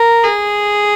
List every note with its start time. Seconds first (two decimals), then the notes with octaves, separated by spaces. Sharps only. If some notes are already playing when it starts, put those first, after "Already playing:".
Already playing: A#4
0.23 G#4